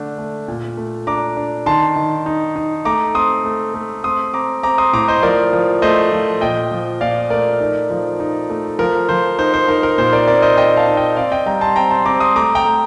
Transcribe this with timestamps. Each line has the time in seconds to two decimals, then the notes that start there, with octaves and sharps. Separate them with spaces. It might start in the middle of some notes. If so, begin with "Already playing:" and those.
Already playing: D3 A3 D4
0.18 A3
0.48 A#2
0.77 A3
1.07 D4 A#5 D6
1.37 D4
1.66 D#3 A5 C6
1.96 D#3
2.26 D#4
2.56 D#4
2.85 A3 A#5 D6
3.15 C4 C6 D#6
3.45 A3
3.74 A3
4.04 C4 C6 D#6
4.34 C4 A#5 D6
4.63 C4 A#5 D6
4.78 C6 D#6
4.93 A2 A#5 D6
5.08 C5 D#5
5.22 F3 A#4 D5
5.53 F3
5.82 A3 C5 D#5
6.12 F3
6.41 A#2 D#5 G5
6.71 F3
7.01 A#2 D5 F5
7.30 A3 A#4 D5
7.60 D#4
7.90 F3
8.20 D#4
8.50 A3
8.79 F3 A#4
9.09 F3 C5
9.39 D#4 C5
9.54 C5
9.68 D#4 A#4
9.83 A#4
9.98 A#2 C5
10.13 A#4 D5
10.27 C4 A#4 D5
10.42 C5 D#5
10.57 C4 D#5 G5
10.77 F5 A5
10.87 D#4
10.97 D#5 G5
11.16 C4 D5 F5
11.32 D#5 G5
11.46 G3 G5 A#5
11.61 A5 C6
11.76 C4 G5 A#5
11.91 A5 C6
12.05 C4 A#5 D6
12.20 C6 D#6
12.35 A3 A#5 D6
12.55 G5 A#5
12.65 A3